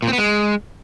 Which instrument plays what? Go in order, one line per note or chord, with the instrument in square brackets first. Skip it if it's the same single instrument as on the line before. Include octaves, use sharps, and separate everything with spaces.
[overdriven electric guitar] A#2
C4
B3
G#3